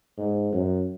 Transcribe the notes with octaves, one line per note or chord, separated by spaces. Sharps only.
G#2
F#2